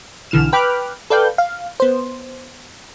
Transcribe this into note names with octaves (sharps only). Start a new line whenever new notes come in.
B1 D3 E3 F6 E7
B4 G5 B5 D6 F6 F#6
A4 B4 D5 F5 G5 G6
F5
B3 C5